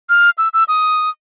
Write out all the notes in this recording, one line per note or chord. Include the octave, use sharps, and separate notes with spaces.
F6
E6
E6
D#6